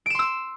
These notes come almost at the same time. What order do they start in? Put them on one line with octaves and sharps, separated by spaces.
D7 E7 C6 E6